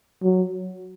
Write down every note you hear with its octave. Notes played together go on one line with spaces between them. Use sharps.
F#3